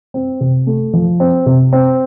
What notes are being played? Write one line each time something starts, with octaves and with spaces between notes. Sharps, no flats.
C4
C3
A3
F3
C4
C3
C4